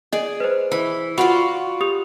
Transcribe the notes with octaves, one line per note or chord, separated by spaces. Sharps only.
G#4 D5 D#5
B4 C5
E3 B5
F4 F#4 D5 F5 F#5 B5
G4 D#6 F7